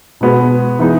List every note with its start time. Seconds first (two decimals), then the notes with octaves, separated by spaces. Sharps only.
0.21 B2 G#3 B3 F#4 B4
0.79 E3 B3 D#4 G#4